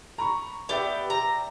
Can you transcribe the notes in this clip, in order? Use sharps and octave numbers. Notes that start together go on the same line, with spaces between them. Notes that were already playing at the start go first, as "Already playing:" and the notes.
A#5 B5 C#6
B3 G4 D5 E5 G5
A#5